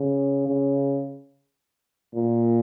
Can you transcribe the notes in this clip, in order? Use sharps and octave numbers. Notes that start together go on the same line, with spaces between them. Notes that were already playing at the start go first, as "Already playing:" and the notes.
Already playing: C#3
C#3
A#2